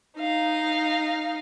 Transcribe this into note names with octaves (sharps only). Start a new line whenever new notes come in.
D#4 F5